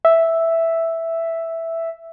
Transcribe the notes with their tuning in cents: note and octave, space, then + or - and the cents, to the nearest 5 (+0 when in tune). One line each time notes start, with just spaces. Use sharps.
E5 +0